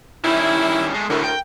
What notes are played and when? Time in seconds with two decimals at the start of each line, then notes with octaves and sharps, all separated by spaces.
0.25 D#3 G3 C#4 E4
0.94 G#3 A3
1.10 D2 A2 D3 E4 F#4 A#4
1.24 G5